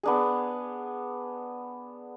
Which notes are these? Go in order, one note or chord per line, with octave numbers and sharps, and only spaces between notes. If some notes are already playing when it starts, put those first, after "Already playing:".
B3 D4 G#4